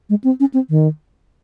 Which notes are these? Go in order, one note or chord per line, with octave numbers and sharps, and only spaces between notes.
G#3
C4
C#4
C4
D#3